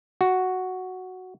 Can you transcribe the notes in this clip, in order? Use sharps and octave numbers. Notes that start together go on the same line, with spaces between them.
F#4